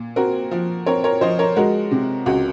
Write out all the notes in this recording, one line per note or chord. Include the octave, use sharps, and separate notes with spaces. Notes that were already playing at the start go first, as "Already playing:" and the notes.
Already playing: A#2
C4 F#4 A#4
F3
C4 A#4 C#5
A#4 C#5
F3 C5 D#5
A#4 C#5
G#3 F#4 A#4
C3
C#2 F#4